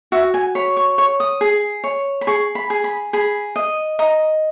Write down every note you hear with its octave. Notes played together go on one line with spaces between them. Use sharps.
F#4 E5
G#5
C#5 B5
C#6
C#5 C#6
D#6
G#4
C#5
B5
G#4 C#6
B5
G#4
B5
G#4 B5
D#5
D#5 A#5